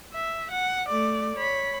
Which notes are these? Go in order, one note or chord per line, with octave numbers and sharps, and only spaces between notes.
E5
F#5
A3 D5
C#5 B5